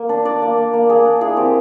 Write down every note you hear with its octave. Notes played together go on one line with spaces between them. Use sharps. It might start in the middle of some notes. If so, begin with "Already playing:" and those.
Already playing: A#3
D4
D4 D5
A#3
A#3
A#3
A#3 G#4
D4
E4 G#4
C4 G4